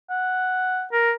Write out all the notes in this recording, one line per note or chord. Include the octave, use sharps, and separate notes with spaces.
F#5
A#4